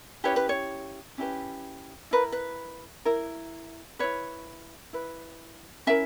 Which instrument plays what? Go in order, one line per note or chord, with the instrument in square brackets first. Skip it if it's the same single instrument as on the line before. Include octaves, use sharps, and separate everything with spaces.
[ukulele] C#4 E4 G4 B4 C#5
B4
C#5
C#4 E4 G4 B4
E4 A#4 B4
B4
E4 A#4
E4 B4 C#5
E4 B4
C#4 E4 A#4 E5